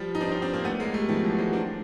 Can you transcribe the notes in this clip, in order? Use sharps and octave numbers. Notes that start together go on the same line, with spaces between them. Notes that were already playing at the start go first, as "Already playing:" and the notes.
Already playing: F3 G3
D#4
C4 D4
C#4 D#4
C4 D4
A#3 C4
A3 B3
G#3 A#3
G3 A3
D#3 F3
E3 F#3
F#3 G#3
C4 D4